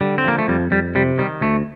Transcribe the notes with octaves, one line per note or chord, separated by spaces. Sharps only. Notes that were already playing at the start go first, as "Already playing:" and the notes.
D3 G3
C4
F3 A#3
A3
F2 G3
F2 G3
C3 G3
D#3 G3
D2 A3